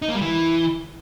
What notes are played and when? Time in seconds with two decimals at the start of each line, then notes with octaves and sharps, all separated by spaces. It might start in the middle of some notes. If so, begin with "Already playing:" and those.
0.02 D#4
0.09 A#3
0.15 G3
0.22 E3